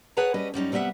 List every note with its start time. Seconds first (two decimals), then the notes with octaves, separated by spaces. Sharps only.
0.17 G#4 B4 C#5 F#5 A5 A#5
0.34 G3 C#4 B4 D#5
0.54 F#2 G3 C#4 D#4
0.72 C3 G3 B3 D#5 E5 F#5